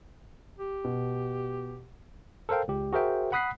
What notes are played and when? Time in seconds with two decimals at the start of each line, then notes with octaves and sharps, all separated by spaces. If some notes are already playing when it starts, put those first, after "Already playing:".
0.59 G4
0.84 B2
2.49 A4 A#4 C5 F5 G5
2.68 C#2 G4
2.93 F#4 G#4 A#4 C5 E5 G5
3.32 F#5 B5 D#6 F#6 B6 C7